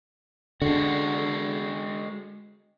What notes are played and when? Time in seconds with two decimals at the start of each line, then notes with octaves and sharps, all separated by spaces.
0.62 D3 G#3 F#4